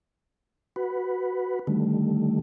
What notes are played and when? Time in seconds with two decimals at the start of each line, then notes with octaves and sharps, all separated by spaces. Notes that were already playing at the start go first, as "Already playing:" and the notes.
0.76 F#4 B4
1.67 D3 D#3 G3 A3